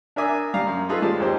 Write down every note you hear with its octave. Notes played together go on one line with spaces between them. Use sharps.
D4 A#4 E5 G#5 D#6
G3 F5 A#5 D6
F#2
D#4 F4 G#4 A4 B4 F5
F3 G3 G#3 A5
D#2 D#4 G4 C5